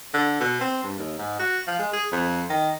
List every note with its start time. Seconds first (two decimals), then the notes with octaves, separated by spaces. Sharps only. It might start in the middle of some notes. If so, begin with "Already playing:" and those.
0.14 D3
0.40 B2
0.61 C4
0.83 G2
0.98 D#2
1.18 G#2
1.39 F#4
1.67 F3
1.79 G#3
1.93 G#4
2.12 F2
2.49 D#3